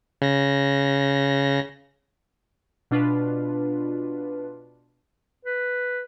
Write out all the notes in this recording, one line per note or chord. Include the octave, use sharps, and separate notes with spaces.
C#3 A#6
B2 D4 F4 B4
B4